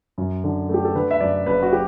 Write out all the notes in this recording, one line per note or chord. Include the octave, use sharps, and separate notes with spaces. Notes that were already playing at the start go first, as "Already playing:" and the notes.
F#2
D3
A3 G4
A4
D3 B4
E5
F#2 D5
F#1 B4
F#4
G4